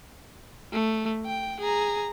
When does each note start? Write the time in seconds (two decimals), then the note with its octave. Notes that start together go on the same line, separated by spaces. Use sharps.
0.72 A3
1.26 G5
1.60 G#4 A#5